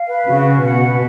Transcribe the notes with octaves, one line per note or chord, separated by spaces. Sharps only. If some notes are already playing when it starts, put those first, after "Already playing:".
Already playing: F5
B4
C#3 F#4
C#4
B2 F#5
B4